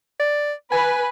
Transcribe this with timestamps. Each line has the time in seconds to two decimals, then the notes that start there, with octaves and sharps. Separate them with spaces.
0.20 D5
0.72 B4 G#5